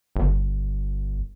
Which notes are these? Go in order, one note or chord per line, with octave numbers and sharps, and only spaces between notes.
G1